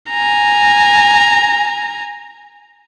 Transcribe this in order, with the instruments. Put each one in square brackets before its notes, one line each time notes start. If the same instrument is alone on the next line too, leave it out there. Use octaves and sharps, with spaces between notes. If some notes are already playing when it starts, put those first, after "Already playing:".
[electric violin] G#5 A#5